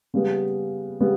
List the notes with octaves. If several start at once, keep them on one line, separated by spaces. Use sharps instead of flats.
C#3 G3 B3
C#3 G3 B3